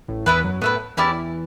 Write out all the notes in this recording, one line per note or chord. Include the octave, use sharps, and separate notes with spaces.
A1 A2
E2 E3 B3 E4 B4
F#2 F#3
A2 A3 B3 E4 B4
E2 E3 C#4 E4 G4 D5